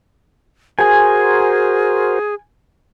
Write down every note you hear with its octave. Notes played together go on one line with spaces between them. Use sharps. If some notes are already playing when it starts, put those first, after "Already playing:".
F#4 G#4 A#4 C5 G#5